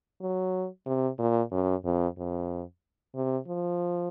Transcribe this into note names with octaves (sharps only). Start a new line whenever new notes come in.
F#3
C3
A#2
F#2
F2
F2
C3
F3